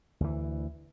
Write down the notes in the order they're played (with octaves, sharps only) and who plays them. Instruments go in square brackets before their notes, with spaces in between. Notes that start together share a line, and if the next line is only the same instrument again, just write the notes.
[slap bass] D2 E3